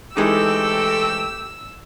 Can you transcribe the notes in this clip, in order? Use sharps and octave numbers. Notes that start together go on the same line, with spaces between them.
E3 G#3 A3 C4 D#4 G4 A4 E6